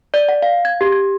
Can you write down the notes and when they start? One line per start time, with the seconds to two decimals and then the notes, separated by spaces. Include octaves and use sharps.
0.14 D5
0.29 F#5
0.42 F5
0.65 G#6
0.81 G4
0.92 G#6